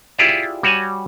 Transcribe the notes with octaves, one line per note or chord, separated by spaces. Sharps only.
E4 F4 G4 G#4 D5 E5
G3 F#4 C#5 F#5 G#5